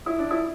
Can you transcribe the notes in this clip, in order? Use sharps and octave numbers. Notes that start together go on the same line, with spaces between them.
E4
D4
E4